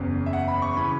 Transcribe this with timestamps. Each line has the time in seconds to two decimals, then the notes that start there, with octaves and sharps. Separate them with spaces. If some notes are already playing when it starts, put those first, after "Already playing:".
Already playing: F#1 E2 C#3
0.26 E5
0.33 F#5
0.48 B5
0.62 C#6
0.76 C#3 E3 C#4 B5